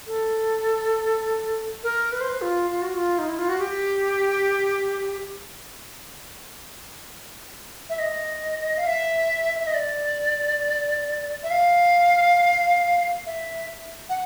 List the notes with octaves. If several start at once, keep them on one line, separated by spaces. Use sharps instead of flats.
A4
A#4
B4
C5
B4
F4
F4
F#4
F4
D#4
E4
F4
F#4
G4
E5
D#5
F5
E5
E5
D#5
D5
E5
F5
E5
F#5